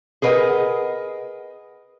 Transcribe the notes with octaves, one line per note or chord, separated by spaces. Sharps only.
G#4 A#4 B4 D#5 F#5